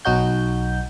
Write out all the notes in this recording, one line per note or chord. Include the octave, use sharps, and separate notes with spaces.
B1 F#3 D#4 F#4 G6